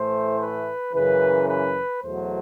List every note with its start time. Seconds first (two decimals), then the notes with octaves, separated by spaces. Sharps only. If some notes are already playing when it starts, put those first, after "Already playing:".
Already playing: A2 E3 A3 C5
0.39 B4
0.93 F#2 C#3 E3 B4
1.48 B4
2.02 E2 B2 F#3 A3 C5